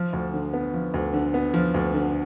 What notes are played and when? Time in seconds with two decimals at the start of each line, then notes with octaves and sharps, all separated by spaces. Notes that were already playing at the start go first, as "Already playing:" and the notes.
Already playing: F3
0.13 D2
0.34 D3
0.53 B3
0.74 F3
0.94 D2
1.14 D3
1.34 B3
1.54 F3
1.74 D2
1.94 D3